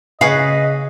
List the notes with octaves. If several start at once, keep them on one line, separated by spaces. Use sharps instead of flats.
C#3 F#4 G#4 B4 D#5 F5